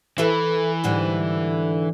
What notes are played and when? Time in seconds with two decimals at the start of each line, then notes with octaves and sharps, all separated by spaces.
0.18 E3 E4 A4 B4
0.84 G#2 D3 G3